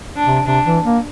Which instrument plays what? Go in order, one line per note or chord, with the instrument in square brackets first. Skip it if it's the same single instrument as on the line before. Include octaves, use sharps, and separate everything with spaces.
[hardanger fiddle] D4
[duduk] C3
[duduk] C3 [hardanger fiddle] D4
[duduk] E3
A#3